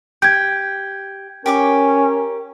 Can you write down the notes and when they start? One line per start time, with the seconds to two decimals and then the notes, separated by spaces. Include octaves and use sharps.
0.22 G4 G6 G#6
1.46 C#4 G4 A#4 C#6 D6